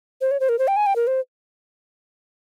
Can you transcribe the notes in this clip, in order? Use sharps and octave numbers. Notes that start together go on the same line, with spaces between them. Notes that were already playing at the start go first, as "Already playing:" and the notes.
C5
C#5
C5
A#4
C5
G5
G#5
G5
A#4
C5